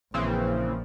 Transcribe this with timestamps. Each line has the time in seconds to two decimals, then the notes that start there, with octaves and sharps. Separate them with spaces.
0.14 A#1 C#3 E3 F3 C4